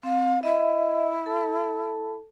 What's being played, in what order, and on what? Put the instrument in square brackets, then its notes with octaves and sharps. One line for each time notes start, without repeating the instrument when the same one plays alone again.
[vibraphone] C4 [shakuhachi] F5
[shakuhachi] E4 [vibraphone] D#5 E5
[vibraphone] A4 A5